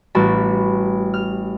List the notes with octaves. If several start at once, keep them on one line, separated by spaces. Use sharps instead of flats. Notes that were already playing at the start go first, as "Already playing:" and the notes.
A1 G3 F#4 A5 B5
F6